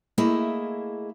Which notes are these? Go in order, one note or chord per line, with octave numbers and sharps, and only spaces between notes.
A3 A#3 E4 G#4 D#5 E5